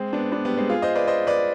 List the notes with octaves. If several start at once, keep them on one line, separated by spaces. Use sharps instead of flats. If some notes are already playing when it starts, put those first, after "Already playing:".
Already playing: G#3 C4
B3 D4
B3 D4
G3 B3
G#3 C4
F4 G#4
C5 D#5
B4 D5
C5 D#5
B4 D5